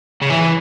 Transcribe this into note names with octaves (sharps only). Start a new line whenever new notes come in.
C#3
E3